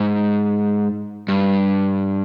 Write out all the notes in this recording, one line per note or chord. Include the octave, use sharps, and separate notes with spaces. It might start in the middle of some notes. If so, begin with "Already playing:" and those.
Already playing: G#2
G2